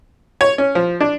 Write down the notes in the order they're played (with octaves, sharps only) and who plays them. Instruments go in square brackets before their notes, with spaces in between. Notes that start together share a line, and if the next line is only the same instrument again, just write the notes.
[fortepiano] C#5
C#4
F3
D4